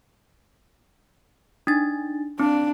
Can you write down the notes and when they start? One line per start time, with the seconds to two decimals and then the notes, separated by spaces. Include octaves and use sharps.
1.67 D4 D#4 A6
2.39 C4 D4